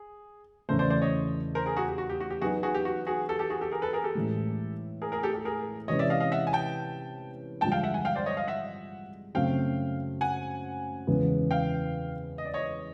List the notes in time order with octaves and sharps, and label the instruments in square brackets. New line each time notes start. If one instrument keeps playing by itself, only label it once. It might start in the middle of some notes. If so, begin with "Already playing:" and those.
Already playing: [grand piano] G#4
[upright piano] E2 C#3 E3 A3 [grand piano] A#4 C5
[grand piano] C5 D5
C5 D5
C#5 D#5
A#4 C5
G#4 A#4
F#4 G#4
G4
F#4
G4
F#4
G4
[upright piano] F#3 B3 D#4 [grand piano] F#4 G#4
[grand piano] F#4 G#4
G4
F#4
F#4 G#4
G4 A4
G4 A4
F#4 G#4
G4 A4
G#4 A#4
A4 B4
G#4 A#4
G4 A4
[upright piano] A2 E3 G#3
[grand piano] G#4 A#4
G#4 A#4
G4 A4
G4 A4
G#4 A#4
[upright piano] C3 E3 G#3 C#4 [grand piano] C#5 D#5
[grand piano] D5 E5
D#5 F5
D#5 F5
E5 F#5
G#5
G5 A5
[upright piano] G2 D3 F3 G#3 [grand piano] G5 A5
[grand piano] F5 G5
E5 F#5
F#5 G#5
F5 G5
C5 D5
C#5 D#5
D#5 F5
E5 F#5
[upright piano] F#2 C#3 F#3 A3 C4 [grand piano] F5 G5
[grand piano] F#5 G#5
[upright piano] E2 C#3 E3 G#3 B3
[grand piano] F5 G5
D#5
D5
C#5 D#5